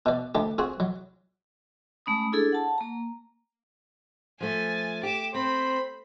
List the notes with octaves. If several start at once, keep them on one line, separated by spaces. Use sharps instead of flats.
B2 D5
D2 G4
C4 F#4 G#4
F#3
G#3 A3 C#4 B5 D#6
D4 E4 G#4 A4
F#5 A5
A#3 A#5
F3 A3 G#5 A6
G4 D6 E7
C4 C5 B5